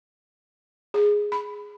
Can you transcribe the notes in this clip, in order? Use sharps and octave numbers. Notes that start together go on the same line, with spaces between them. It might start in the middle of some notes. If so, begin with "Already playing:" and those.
G#4
B5